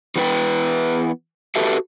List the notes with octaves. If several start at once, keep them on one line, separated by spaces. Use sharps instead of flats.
E3 G3 B3 D#4 B4 G5
F#4 G4 A4 B4 E5